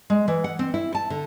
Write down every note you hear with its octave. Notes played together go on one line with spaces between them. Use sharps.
G#3
E3
F#5
C4
E4
A5
D3